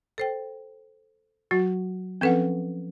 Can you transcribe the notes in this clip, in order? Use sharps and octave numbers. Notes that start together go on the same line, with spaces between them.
A4 C5 G5
F#3 F#4
F3 C4 C#4 A4 B4 F#5